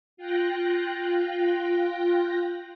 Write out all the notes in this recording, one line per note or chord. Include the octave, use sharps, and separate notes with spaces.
F4 G5 F#6 A#6